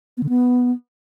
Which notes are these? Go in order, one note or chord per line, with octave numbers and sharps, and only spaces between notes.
B3
D3
B3